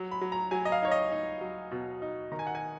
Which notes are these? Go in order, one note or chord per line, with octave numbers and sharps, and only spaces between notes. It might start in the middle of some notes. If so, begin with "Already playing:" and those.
Already playing: F#3
B5
F#3
A#5
F#3 G#5
D#5
F5
D#4 C#5
D#5
D#4
F#3
B2
D#4
D#3 A#5
G#5
F#5
G#5